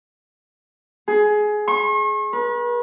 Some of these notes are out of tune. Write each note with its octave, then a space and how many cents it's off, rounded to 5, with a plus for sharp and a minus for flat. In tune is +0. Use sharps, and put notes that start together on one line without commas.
G#4 +20
C#6 -45
B4 -40